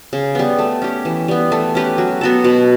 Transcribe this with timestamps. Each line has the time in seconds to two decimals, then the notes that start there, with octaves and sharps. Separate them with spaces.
0.13 C#3
0.35 G3 B3
0.59 A3
0.82 C#4 G4
1.05 E3
1.28 G3 B3
1.52 A3
1.75 C#4 G4 B4
1.98 F#3
2.21 B3 F#4 A4
2.44 B2